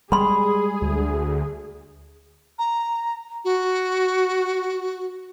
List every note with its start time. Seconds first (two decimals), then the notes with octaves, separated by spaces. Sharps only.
0.12 G3 G#3 G#4 B5 C6
0.82 D2
2.59 A#5
3.45 F#4